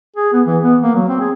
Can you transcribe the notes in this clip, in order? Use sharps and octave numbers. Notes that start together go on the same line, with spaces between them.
G#4
B3
E3
B3
A#3
F#3
C4
G#4